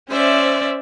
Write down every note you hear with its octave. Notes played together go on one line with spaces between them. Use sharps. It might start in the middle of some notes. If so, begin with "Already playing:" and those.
C#4 C5 D5 E5